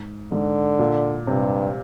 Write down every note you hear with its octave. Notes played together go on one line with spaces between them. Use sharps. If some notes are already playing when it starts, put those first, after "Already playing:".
Already playing: G#2
G#2 D3
A#2
G2 C3